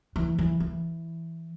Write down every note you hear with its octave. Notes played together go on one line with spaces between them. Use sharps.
E3
E3
E3